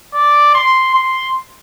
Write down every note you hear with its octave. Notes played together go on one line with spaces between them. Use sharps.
D5
C6
C6